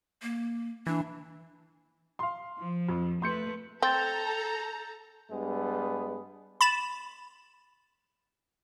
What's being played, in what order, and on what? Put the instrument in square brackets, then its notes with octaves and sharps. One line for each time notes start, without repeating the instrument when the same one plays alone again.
[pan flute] A#3
[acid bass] E3 [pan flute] D4
[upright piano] F5 C6
[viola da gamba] F3
[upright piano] F2
[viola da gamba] A3 B4 [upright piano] C6 G6 C#7
[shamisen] C4 [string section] A4 A#5 [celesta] G6 A6 G7
[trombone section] G2 G#3 B3
[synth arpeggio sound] B5 A6 E7